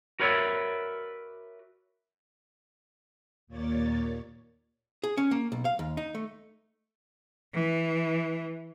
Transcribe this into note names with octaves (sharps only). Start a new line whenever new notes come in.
F#4 A#4 B4 C#5 D5 E5
D#2 A#2 A#3 C#5 D5 A6
G#4
C#4
A#3
B1
F5
D#2
D#4
A3
E3